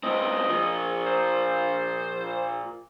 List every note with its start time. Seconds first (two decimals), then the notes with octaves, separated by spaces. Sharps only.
0.03 C#2 C4 D#5
0.48 A#2 F3
1.06 C5